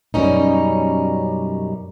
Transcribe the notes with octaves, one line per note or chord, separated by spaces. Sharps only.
F#2 B2 F3 G3 C#4 D#4